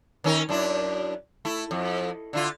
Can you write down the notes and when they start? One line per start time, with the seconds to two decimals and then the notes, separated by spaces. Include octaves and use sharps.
0.24 D#3 C#4 A#4
0.49 F#2 D4 E4
1.45 A3 E4
1.71 F2
2.33 D3 E4 F4